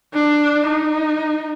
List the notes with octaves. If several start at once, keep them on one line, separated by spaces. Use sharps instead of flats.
D4
D#4